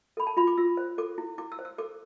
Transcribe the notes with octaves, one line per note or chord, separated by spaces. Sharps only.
A4 B5
A5
F4 B5
D6
F4 E6
C5
A4 D6
E4
E4 D6
E6
C5
E6
A4 D6